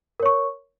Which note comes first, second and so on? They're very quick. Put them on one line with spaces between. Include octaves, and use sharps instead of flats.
A#4 C#5 C#6